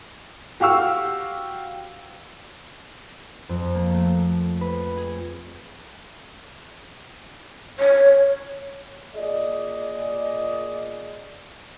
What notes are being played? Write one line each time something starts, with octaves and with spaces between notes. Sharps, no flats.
F#4 G4 F5 C#6 E6
F2
A#3
A3
B4
G#4
C#5
A#2 G#4 D5 D#5